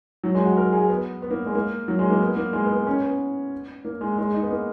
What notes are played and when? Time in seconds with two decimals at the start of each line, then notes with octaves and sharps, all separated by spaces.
0.24 F#3
0.35 G#3
0.45 F#4
0.57 A#4
0.73 G#4
0.89 B3
1.22 B3
1.30 A#3
1.46 G#3
1.55 A#3
1.88 F#3
1.99 G#3
2.10 A#3
2.21 B3
2.36 A#3
2.53 G#3
2.65 B3
2.76 B3
2.87 C#4
3.02 B3
3.85 A#3
4.01 G#3
4.18 G#3
4.34 D#4
4.42 B3
4.50 A#3